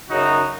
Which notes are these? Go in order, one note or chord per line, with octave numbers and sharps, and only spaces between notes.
F#2 C#3 F#3 D#4 F#4